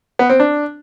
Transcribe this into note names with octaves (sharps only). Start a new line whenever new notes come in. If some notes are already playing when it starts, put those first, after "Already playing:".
B3
C4
D4